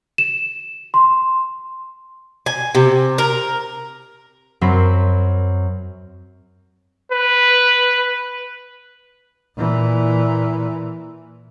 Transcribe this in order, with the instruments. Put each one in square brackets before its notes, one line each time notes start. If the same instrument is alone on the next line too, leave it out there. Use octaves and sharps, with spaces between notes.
[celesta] E7
C6
[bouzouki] G#5
C3
A#4
[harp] F#2 F#3 C4 B5 C7
[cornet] B4
[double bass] A#2 E3